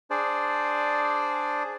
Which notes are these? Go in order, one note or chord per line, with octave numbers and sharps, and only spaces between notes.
D4 G#4 C5 D5